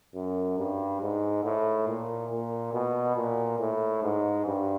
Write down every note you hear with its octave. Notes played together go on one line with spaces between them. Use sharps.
F#2
G2
G#2
A2
A#2
A#2
B2
A#2
A2
G#2
G2